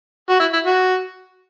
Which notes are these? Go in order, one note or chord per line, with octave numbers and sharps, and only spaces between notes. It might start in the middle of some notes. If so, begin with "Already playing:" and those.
F#4
E4
E4
F#4